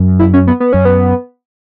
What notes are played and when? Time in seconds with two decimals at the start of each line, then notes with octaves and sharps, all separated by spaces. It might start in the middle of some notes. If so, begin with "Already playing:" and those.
Already playing: F#2
0.19 E4
0.33 C#4
0.47 B3
0.60 B3
0.73 F#2 C#4
0.85 B3